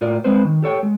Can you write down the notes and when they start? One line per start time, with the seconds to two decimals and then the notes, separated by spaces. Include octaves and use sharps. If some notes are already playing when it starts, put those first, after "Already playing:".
0.01 A2 F4 A#4 D5
0.24 G#3 B3 C4 B4 C5
0.45 D#3
0.62 G4 A4 C#5 G5
0.83 G#3